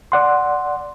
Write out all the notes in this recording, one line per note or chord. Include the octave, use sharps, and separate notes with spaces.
D5 F#5 C6